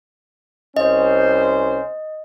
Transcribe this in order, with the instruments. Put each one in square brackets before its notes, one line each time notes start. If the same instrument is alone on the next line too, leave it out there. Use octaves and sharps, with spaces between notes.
[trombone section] C2 C#4 C5 [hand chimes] D#5